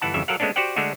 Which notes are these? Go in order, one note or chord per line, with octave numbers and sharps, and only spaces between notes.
G1 E3 E4 F#5 A5
G1 F2 C#3 E3 E5
F#3 A4 A#4 F5 F#5
G#3 A3 B3 C#4 D4
F#4 G4 C5 D5 F#5 G5
D3 G#3 A3 D4 F#4